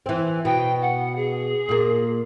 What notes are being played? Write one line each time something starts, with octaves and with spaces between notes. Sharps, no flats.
E3 C4
B2 G5
F#5
G#4
A#2 A#3